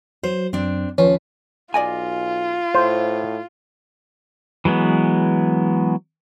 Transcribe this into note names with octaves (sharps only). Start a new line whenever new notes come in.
F#3 C5
F#2 C4 D4
D#2 F3 C#4 B4
B1 F4 D5 D#5 G#5
A2 C5
E3 F#3 G#3 B3